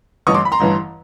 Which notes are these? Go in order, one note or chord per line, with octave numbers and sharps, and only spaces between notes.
A1 G2 E3 C#6 D#6
C6 D6
B5
A#5 C6
A1 G2 E3